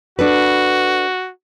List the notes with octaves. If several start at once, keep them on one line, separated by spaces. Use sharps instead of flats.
D4 F#4 A4 B4